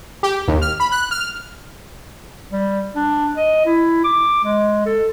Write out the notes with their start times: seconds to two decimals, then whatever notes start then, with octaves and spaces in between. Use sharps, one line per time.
0.23 G4
0.48 D#2
0.62 F6
0.80 B5
0.92 F#6
1.11 F6
2.51 G3
2.96 D4
3.36 D#5
3.65 E4
4.04 D6
4.44 G#3
4.86 A4